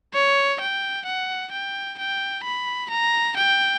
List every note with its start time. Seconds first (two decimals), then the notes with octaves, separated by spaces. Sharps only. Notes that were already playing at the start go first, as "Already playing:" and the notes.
0.14 C#5
0.61 G5
1.06 F#5
1.52 G5
1.99 G5
2.44 B5
2.90 A#5
3.37 G5